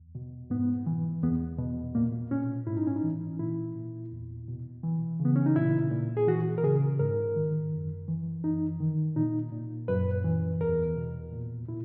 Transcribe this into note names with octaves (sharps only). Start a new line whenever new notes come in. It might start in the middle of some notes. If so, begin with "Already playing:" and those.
Already playing: E2
B2
G#2 B3
E3
E2 B3
B2
A#2 A#3
A#2 C#4
G#2 E4
D#4
C#4
D#4
E3
A#2 E4
A#2
E2
B2
E3
C#3
B3
C#4
D#4
A#2 E4
A#2
G#4
E3 F#4
A#4
C#3 G#4
G#2 A#4
D#3
F#2
E3
F#2 D#4
D#3
A#2 D#4
A#2
F#2 B4
E3
E2 A#4
B2
A#2
A#2 E4